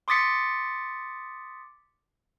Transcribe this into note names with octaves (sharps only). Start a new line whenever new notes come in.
C6 D6 D#6 A6 B6 C#7